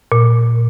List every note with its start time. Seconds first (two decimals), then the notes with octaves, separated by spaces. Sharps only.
0.12 A#2